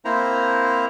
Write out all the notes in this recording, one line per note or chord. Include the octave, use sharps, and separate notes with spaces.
A#3 C4 E4 C5 A#5